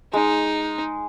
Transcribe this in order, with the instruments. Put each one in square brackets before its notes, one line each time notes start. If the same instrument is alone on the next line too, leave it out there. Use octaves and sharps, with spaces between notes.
[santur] G#3 [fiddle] D#4